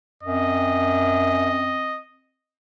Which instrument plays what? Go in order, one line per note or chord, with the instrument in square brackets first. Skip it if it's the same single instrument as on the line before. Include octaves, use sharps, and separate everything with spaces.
[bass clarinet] F#2 [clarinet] C4 [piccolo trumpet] D#5